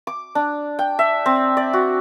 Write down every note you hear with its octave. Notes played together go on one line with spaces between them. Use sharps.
D6
D4
G5
E5
C4
D5
F#4